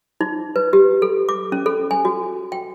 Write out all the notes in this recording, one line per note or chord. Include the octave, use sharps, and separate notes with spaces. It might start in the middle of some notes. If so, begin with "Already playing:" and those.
D#4
B4
G4
A4
D6
C#4
A4
G#5
F#4
G5